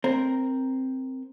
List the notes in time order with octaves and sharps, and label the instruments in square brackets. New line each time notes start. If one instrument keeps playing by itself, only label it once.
[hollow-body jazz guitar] C4 A#4